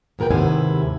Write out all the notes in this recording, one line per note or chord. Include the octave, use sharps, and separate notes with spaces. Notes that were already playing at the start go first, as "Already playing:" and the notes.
E2 A#2 A#4 B4 G5
D#2 G#2 C3 B3 E4 G#5